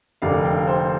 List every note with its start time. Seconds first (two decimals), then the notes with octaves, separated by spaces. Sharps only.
0.22 F1 F2 D3 A#3 D4 F5
0.44 G5
0.56 F5
0.67 C5